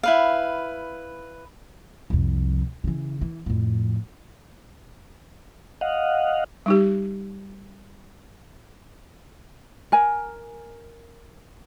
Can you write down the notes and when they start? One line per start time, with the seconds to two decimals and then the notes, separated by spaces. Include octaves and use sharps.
0.03 E4 B4 F5
2.10 C2 F2
2.84 C#3 E3
3.21 E3
3.46 F2 A2
5.81 D#5 F5 F#5
6.66 G3 D#4 G4
9.92 A#4 G#5